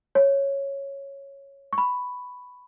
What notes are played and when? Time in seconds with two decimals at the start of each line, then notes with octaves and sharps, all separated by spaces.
0.15 C#5
1.73 C#6
1.78 B5